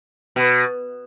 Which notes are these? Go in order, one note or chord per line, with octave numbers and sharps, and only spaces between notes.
B2